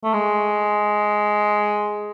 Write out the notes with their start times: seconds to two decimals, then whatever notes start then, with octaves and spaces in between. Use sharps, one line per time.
0.03 A3
0.13 G#3